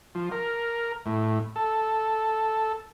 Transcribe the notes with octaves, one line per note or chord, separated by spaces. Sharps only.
F3
A#4
A2
A4